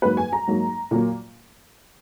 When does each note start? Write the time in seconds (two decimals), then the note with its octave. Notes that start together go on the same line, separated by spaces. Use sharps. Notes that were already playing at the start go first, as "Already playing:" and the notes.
0.02 G#2 F#3 A#3 B4
0.17 G#5
0.33 A#5
0.47 G#2 F#3 A#3
0.91 A#2 F#3 A#3